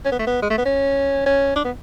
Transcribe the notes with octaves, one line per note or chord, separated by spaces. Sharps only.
C#4
B3
A3
B3
G#3
A3
B3
C#4
C#4
D4
B3